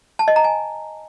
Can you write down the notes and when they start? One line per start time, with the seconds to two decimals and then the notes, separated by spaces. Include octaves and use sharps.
0.19 A5
0.28 D#5
0.36 A#5
0.44 G#5